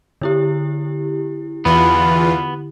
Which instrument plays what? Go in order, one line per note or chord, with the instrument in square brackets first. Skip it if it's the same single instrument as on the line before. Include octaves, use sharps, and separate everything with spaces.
[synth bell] D3 E4 G4
[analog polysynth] E2 E3 F4 [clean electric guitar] B3